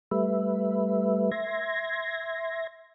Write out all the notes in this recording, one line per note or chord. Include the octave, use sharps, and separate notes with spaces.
G3 A3 B4 E5
E5 C6 G#6 A#6